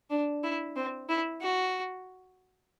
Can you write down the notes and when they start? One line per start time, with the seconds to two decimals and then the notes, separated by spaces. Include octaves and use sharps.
0.10 D4
0.43 E4
0.76 C4
1.09 E4
1.42 F#4